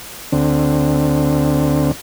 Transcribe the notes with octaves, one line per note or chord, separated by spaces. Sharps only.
D2 D3 C4